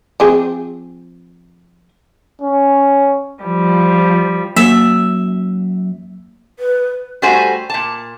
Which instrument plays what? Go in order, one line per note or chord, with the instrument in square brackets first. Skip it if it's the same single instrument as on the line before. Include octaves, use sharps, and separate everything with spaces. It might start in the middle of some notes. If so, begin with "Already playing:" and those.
[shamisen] F3 C4 G#4
[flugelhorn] C#4
[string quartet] F3 G3
[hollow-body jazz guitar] F#2 [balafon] A#3 [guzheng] E5
[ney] B4
[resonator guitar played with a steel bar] G3 A3 F#4 C5 G#5
A#2 A5